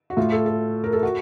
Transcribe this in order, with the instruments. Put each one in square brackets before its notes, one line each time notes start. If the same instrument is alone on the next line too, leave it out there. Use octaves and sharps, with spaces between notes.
[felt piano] F#4
A2 F4
A4
A4
A#4
A4
F#4